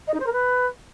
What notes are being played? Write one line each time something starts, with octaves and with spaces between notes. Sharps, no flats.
D#5
D#4
C5
A#4
B4